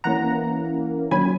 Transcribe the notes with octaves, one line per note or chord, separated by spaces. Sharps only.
E3 A#3 C#4 F#5 A#5
D#3 F#3 C#4 G#5 B5